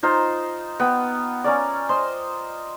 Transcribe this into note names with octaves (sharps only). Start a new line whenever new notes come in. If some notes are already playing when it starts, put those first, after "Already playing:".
D#4 F4 C5
B3 G5
C#4 A#4 D5
C5 D#5 C6